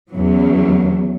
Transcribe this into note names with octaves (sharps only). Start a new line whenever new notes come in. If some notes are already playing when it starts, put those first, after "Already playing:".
E2 C#3 E3 F#3